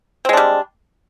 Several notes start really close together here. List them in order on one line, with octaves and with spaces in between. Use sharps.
C4 G#3 D4 G3